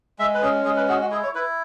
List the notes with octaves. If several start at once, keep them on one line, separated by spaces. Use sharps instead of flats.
G#3 E5
B4
C#4 G#4
G#3 G#4
B4
F#4 G#4
F#4
E4 G#4
C#5
E4 B4